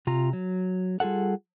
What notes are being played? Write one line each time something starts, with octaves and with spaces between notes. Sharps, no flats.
C3 F4 A#5
F#3
G3 F4 G#4 A4 F#5